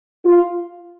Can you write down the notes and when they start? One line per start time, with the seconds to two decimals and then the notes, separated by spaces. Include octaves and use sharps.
0.26 F4